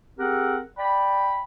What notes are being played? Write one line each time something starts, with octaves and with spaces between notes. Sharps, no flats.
C4 G4 G#4 A#4 F#5
D5 G5 B5